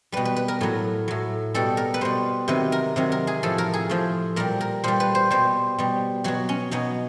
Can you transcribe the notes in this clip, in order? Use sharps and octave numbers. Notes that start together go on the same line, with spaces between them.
B2 G3 B4
B4
B4
A#4
A2 F#3
A2 F#3
B2 G3 A4
A#4
B4
B2 G3 C5
C3 D#3 F#3 B4
A#4
C3 D#3 F#3
A#4
G#4
A2 F3 A4
A#4
G#4
A2 F3
A#2 G3 A#4
A#4
A#2 G3 C5
B4
C5
B2 G3 C5
B2 G3
B2 F#3 F#4
C#4
B2 F#3 D#4